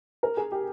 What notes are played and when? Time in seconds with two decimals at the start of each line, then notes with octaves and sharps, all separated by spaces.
0.23 A#4
0.37 G#4
0.52 G4